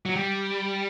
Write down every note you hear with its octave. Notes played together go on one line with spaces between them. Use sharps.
F#3
G3